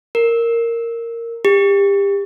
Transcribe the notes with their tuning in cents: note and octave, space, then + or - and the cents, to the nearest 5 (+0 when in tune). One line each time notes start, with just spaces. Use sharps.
A#4 -10
G4 +30